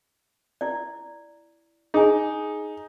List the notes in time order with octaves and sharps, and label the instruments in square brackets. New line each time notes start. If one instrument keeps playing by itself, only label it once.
[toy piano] E4 D5
[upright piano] D#4 [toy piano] G#4 G#5